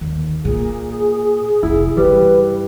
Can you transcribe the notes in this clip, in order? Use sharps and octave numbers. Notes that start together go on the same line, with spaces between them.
D#2 D3
A#2 G#4
F1 F2 E4
G2 G3 B4